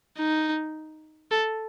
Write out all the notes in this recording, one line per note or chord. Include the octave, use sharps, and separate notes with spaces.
D#4
A4